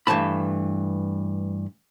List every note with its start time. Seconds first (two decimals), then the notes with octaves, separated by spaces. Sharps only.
0.07 G2 E3 A3 A5 B5